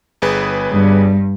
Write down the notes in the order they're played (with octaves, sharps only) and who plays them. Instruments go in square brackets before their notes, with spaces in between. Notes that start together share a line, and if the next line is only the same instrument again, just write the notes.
[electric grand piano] G1 G#4 B4
[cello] G2